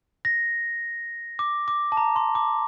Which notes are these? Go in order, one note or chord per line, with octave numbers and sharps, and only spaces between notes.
A#6
D6
D6
A5
A#5
C6
D6